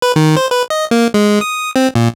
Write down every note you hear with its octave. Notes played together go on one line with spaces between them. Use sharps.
B4
D#3
C5
B4
D#5
A#3
G#3
D#6
C4
A#2